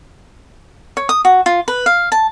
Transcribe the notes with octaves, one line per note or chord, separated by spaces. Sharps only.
C#5
D#6
F#4
F4
B4
F5
A5